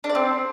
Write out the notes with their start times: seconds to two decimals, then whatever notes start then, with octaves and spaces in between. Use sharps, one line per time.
0.04 D4
0.09 D5
0.15 C4